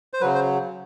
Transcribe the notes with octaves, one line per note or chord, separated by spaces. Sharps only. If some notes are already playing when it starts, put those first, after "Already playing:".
C5
C#3 F#3 B4
C5